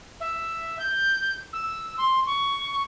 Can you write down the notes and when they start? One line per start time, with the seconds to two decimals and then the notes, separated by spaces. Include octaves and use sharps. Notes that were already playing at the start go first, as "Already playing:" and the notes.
0.20 E5
0.79 G6
1.53 E6
1.98 C6
2.26 C#6